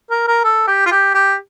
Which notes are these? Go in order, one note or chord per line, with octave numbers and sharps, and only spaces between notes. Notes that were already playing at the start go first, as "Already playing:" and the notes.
A#4
A#4
A4
G4
F4
G4
G4